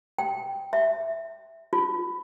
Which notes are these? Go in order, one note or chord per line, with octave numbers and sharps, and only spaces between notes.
G5
E5
F4